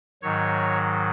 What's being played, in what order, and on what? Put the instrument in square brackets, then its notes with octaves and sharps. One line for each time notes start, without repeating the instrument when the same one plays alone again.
[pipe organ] G#2 D#3 F#3 C#5